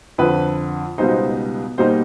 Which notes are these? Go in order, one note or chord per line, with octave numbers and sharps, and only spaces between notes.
F2 D3 F3 B4
C#2 B2 G3 B3 D#4 C5
B2 G3 A#3 D#4 C5